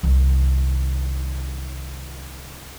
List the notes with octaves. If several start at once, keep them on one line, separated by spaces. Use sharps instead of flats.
C2 D#3